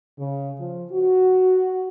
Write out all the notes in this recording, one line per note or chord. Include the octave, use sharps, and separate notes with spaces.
C#3
F3
F#4